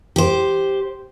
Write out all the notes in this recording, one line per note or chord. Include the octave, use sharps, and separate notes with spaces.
G4 C5